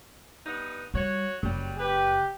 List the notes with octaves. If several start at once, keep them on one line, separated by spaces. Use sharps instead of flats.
G2 B3 D#4
G3 F#4 C#5
F#1 F#3 G3
G4 B4